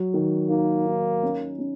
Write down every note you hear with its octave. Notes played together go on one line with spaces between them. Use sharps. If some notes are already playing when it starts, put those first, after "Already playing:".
Already playing: F#3
D#3
A#3 D#4
D#4
C#4
C#4